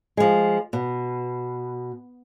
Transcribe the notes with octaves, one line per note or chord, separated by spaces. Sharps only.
F3 G#3
B2